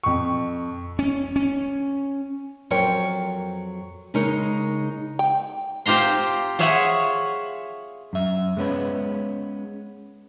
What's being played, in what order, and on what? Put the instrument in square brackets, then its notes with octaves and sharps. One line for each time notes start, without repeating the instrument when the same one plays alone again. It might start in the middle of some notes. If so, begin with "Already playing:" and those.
[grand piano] F2 C#6
[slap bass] C#4
C#4
[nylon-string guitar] F2 F#3 A#4 C#5 G5
C#3 G#3 D#4 A#4 C#5
[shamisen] G5
[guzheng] C4 F4 G4 A#5 C6
F4 G#4 C#5 E5 F#5 G#5
[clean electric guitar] F#2 E5
G#3 B3 C#4 B4